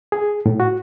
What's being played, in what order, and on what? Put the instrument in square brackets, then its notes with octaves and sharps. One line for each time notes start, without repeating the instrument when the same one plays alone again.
[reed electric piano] G#4
A2
F#4